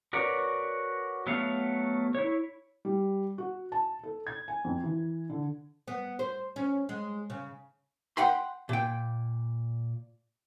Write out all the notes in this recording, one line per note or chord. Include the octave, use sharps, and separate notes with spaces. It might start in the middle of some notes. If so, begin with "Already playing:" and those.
F#4 A#4 B4 C#5 D5
F#3 A3 B3 F5
E4 C#5
G3
F#4
A5
A4
G#6
G#5
F2
E3
D3
B3
C5
C#4
G#3
C#3
F#5 G5 B5 C6
A#2 G5